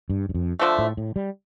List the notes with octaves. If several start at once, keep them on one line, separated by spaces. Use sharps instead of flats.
G2
G2
F2
D3 F3 A3
A2
A2
G3